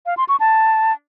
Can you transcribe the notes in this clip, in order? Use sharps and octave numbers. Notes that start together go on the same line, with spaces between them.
F5
C6
C#6
A5